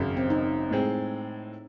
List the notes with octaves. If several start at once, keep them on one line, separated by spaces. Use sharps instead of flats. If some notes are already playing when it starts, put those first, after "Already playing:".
Already playing: G#1 F#2 C#3
C4
D#4
A2 G#3 C4